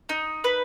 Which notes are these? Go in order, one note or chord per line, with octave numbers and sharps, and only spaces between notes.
D#4
B4